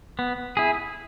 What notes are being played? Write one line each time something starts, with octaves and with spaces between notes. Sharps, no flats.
B3
E4 G#4